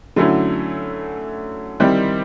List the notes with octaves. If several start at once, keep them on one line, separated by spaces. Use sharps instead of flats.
D3 F#3 A3 C#4 E4
D#3 G3 C4 E4